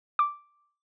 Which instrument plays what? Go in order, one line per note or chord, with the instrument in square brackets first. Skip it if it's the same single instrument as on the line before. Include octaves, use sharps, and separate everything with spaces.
[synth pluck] D6